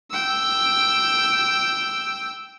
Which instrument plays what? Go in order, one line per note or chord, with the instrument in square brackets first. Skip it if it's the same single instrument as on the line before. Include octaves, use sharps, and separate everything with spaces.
[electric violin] G5 E6